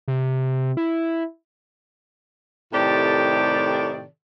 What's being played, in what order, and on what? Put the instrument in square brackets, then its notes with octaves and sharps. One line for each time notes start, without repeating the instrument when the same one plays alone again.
[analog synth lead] C3
E4
[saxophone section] A2 C3 D#3 G4 A4 D5